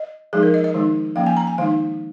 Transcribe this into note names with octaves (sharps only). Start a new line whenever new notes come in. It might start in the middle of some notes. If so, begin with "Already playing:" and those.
Already playing: D#5
F3 G#3 D#4 G#4
A#4
D#5
D#5
D#3 G#3 D#4
F3 A#3 C#4 F5
G#5
A#5
G#5
D#3 G#3 D#4 F5